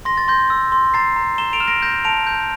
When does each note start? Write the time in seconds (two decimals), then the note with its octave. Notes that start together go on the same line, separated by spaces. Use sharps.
0.05 C6 A#6
0.17 A6
0.28 C6 G6 A#6
0.50 E6
0.72 C6
0.94 A#5 A6 C7
1.16 A#5
1.38 A#5 E7 G7
1.53 D7 F7
1.60 F6 E7
1.68 A#6 D7
1.82 G6 A#6
2.04 A5 D7 F7
2.27 G6